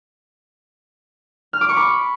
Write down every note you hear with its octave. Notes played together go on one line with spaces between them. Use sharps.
F6
D6
C#6
B5